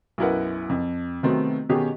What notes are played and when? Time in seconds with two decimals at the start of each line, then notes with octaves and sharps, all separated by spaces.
0.18 B1 F#2 E4 A#4 B4 F#5
0.69 F2
1.23 C3 D#3 F#3 A3 B3 C4
1.69 B2 D#3 C#4 G4 G#4